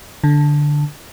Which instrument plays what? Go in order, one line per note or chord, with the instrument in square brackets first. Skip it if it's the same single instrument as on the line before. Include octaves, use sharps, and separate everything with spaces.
[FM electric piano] D3